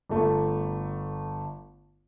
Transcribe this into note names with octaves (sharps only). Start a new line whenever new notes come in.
G1 A3